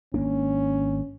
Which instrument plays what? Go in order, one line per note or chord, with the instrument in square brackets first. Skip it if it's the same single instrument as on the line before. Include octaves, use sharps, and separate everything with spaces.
[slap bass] G#1 A#3 D4 [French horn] C#4